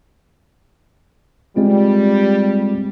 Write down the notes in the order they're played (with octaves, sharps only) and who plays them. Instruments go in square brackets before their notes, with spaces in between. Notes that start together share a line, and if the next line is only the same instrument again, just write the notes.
[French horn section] G3 [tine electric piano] G#3 C4 F4